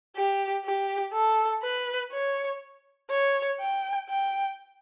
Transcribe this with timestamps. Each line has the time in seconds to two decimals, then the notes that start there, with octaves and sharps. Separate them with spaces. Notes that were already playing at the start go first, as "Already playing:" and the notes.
0.16 G4
0.65 G4
1.13 A4
1.63 B4
2.12 C#5
3.10 C#5
3.60 G5
4.09 G5